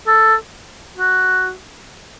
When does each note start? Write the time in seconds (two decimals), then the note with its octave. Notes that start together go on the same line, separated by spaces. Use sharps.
0.07 A4
0.98 F#4